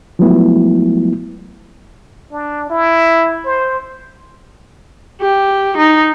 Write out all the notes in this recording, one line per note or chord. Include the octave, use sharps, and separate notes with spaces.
F3 F#3 G#3 A3 B3 E4
D4
E4
C5
G4
D#4